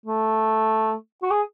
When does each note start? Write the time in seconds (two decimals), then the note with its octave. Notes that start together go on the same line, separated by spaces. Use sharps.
0.06 A3
1.23 F#4
1.31 G#4